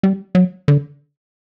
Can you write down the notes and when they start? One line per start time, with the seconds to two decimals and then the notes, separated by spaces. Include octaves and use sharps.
0.03 G3
0.35 F#3
0.68 D3